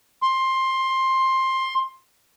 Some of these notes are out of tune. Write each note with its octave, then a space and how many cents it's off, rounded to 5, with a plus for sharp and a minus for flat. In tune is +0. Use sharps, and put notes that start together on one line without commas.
C6 +15